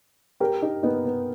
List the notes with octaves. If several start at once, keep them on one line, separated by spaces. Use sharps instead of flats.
G4 A#4
D#4 G4
B3 D#4
B3